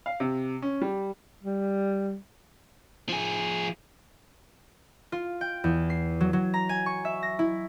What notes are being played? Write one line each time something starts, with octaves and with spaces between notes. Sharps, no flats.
F5
C3
C#4
G3
G3
F3 G#4
F4
G5
E2
C7
F#3
F#3
A#5
G#5
C#6
E5
A#6
E4